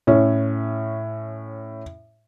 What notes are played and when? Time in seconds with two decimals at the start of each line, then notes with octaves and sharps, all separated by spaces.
0.07 A2 C#4